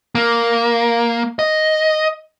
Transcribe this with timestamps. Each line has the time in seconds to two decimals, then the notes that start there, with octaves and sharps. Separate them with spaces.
0.15 A#3
1.39 D#5